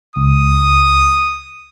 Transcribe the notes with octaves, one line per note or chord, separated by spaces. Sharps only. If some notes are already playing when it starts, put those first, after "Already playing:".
C#2 D#6